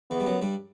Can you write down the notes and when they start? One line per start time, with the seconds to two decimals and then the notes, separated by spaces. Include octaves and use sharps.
0.11 E2 E3 B3
0.20 G3
0.26 F#2 F#3
0.42 G2 G3